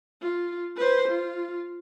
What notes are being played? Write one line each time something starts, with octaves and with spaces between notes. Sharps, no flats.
F4
B4 C5
F4